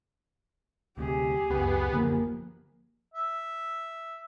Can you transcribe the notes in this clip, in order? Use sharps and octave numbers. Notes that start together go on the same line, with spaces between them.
D2 C3 G4 G#4
C#2 F#2 B3
F#2 D3 F3 F#3 A#3
E5